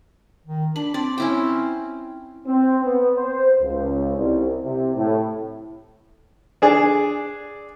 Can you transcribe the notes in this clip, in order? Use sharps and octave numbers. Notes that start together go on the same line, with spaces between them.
D#3
D4 B5
C4 D5
C#4 E4 G5
C4
B3
C5
C#2
C2
C3
A2
D4 G#4 D5